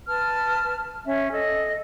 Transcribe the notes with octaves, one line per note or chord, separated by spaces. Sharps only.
B4 A5 F6
C#4 E5
A4 D#5